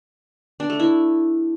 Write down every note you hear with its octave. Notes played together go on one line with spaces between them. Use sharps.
D4
A3
E4